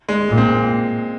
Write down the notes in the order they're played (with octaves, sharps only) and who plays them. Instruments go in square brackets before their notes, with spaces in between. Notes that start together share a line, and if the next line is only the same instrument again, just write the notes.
[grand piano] G#3
[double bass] A#2
[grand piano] C4